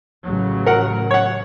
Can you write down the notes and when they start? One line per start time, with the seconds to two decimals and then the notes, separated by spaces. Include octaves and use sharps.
0.25 A1 C#3 F#3
0.66 A#4 F#5
1.11 C#5 F#5